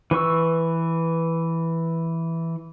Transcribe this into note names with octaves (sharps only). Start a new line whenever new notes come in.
E3 B4 C#6 E6